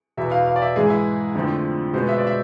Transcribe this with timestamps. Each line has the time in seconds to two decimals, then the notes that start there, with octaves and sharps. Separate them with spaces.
0.17 E2 B2 B3 E5
0.31 F5
0.47 F5
0.56 D5
0.62 E5
0.76 G#2 E3 G#3 G#4
0.90 E4
1.35 F2 D3 F3 A3 C4
1.93 B2 G#3 B3 C5
2.09 E5
2.18 D5
2.27 E5